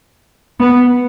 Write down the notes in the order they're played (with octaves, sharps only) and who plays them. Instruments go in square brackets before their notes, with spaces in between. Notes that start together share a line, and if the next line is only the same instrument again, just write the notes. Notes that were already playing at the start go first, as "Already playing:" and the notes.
[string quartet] B3